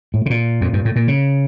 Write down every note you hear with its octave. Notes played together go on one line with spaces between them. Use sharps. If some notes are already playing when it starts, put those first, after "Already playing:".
A2
C#3
A#2
F2
G2
A2
A#2
C#3